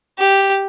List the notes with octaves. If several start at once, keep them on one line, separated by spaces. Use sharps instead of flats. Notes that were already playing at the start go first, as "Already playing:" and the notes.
G4